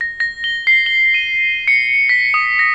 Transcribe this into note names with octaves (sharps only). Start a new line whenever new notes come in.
A#6
A#6
G7
C7
G7
D#7
C#7
B6
D#6
A#6